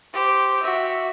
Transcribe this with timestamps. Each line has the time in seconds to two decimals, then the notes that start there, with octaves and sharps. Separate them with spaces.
0.13 G4 C5
0.63 F#4 E5